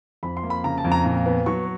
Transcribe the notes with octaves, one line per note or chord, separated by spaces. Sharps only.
F2 B5
C6
A#3
B5
C#3 A#5
A5
F2
A#5
A#2
B3
F#3 C#6